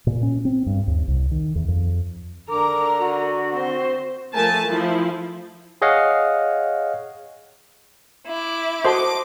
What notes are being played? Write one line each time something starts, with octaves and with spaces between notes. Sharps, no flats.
A#2
C#4
C4
G2
D#2
C2
D#3
E2
F2
D3 A#4 A#5 D6
F#4
C4 C5
F3 A3 A#4 G#5 A5
F3 E4
G#4 C#5 D#5 F5 F#5
E4 D6
F#4 A4 C5 D#5 A5 C6 D6